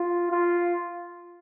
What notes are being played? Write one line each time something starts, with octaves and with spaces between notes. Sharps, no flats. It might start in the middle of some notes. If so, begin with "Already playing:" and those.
Already playing: F4
F4